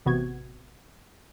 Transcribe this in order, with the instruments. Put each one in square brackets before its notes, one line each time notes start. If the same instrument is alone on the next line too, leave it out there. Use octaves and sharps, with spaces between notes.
[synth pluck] A1 C3 B3 F#4 G#6